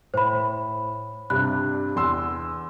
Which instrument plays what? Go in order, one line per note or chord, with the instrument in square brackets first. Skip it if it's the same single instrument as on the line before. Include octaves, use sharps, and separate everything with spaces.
[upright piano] A2 [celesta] C5 B5
[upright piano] G2 C3 D4 [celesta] B5 F#6
[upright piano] E2 C6 E6